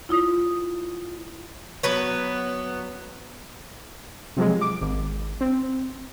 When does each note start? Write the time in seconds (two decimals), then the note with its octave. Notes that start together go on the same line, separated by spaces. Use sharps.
0.09 E4 F4 D#6
1.83 F#3 B3 B4 C#5
4.37 C3 F3 F#3 G#3
4.61 D6
4.81 G#1
5.41 C4